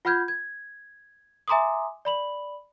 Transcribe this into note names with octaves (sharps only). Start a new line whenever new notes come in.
F4 F#5 B5 F6 G6 G#6
G#6
E5 G#5 A#5 C6 D6 D#6
D5 B5 F#7